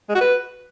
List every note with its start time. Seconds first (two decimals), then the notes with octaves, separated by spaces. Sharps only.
0.09 G#3
0.15 F#4
0.21 B4